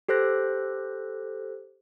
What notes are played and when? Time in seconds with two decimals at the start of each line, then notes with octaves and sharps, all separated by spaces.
0.09 G4 A4 C5 F#6 A#6